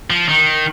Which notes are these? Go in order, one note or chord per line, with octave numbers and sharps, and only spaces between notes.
F3
D#3